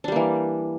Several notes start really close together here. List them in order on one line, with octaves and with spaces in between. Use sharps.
D4 G3 A#3 E3